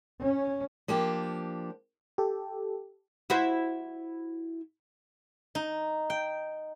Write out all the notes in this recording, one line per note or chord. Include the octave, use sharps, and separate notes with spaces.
C#4
F3 A#3 D4 G4
G4 A4
E4 F#4 C5
D#4
G5